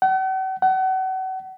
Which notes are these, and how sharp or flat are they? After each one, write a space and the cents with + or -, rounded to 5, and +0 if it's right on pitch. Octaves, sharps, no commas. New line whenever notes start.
F#5 +45
F#5 +35